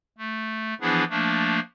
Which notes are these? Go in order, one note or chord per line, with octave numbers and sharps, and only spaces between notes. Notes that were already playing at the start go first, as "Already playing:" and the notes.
A3
E3 F3 B3 D4 E4 G#4
F3 A3 A#3 D4